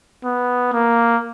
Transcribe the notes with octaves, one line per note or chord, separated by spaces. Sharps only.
B3
A#3